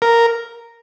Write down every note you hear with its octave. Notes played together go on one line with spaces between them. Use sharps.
A#4